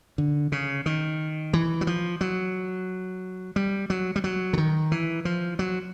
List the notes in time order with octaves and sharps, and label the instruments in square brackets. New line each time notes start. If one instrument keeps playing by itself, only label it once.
[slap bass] D3
C#3
D#3
E3
F#3
F3
F#3
G3
F#3
G3
F#3
D3
D#3
E3
F3
F#3